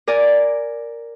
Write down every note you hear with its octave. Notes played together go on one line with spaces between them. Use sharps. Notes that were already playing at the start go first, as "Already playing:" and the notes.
A#4 D5 G#5 A#5